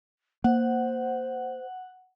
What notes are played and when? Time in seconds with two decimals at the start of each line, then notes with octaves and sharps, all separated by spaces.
0.44 A#3 C5 F#5